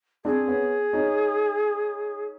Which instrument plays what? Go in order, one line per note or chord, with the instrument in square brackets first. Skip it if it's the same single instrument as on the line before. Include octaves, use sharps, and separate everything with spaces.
[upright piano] C4 D4 [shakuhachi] G#4
[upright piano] B3 C#4
C#4 D#4